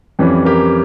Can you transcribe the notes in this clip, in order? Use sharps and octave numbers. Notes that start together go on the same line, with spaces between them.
F2 E3 G3 C#4
G4 A#4